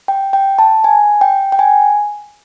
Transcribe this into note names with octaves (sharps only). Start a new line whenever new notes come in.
G5
G5
A5
G#5
G5
G5
G#5